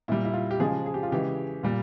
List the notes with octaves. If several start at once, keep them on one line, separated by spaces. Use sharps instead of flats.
A#2 G3 E4
E4
F4
G4
C#3 F3 G#3 G#4
G#4
G4
F4
C#3 E3 G#3 G4
A#2 G3